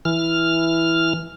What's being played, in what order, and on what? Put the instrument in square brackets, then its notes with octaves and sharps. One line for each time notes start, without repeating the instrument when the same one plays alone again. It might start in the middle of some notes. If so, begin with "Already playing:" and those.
[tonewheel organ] E3 F6